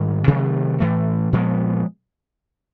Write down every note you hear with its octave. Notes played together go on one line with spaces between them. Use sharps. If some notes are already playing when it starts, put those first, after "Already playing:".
Already playing: G#2 D#3 G3
C3 D#3 F#3 A3
A2 E3 A3
A#2 F3 G#3 B3